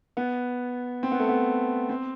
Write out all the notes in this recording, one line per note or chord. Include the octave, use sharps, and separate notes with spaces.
B3
C4
B3
A3
B3
C4